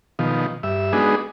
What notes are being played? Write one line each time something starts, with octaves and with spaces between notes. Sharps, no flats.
B2 D#3 F3
G2 E5
G#3 B3 D4 D#4 F#4 G#4